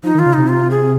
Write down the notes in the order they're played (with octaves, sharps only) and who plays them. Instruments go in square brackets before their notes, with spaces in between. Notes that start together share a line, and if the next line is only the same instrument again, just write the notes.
[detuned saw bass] F3 [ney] D#4
[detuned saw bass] D#3
[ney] F4
[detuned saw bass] C#3
[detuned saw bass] C3 [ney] D#4
[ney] F4
G#4